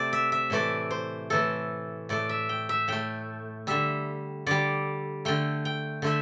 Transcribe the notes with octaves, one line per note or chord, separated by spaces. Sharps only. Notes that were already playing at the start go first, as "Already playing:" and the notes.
Already playing: C3 A3 C5 D5
E5
E5
A2 E3 A3 D5
C5
A2 E3 A3 A4
A2 A3 D5
E5
G5
E5
A2 A3 G5
D3 G3 E5
D3 G3 D5
D3 A3 G5
G5
D3 A3 E5